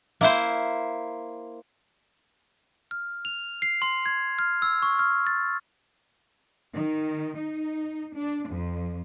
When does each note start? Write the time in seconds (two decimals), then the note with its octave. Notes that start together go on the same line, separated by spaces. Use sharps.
0.21 A#3 E4 C5
2.91 F6
3.25 F7
3.62 C7
3.82 C6
4.06 G#6
4.39 F6
4.62 E6
4.82 C#6
4.99 F6
5.27 A6
6.74 D#3
7.37 D#4
8.16 D4
8.49 F2